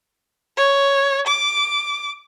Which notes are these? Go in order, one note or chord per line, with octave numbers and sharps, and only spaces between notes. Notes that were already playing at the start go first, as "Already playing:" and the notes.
C#5
D6